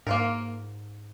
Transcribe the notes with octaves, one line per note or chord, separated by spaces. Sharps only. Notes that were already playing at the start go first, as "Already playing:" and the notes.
G#2 A#3 F4 A#4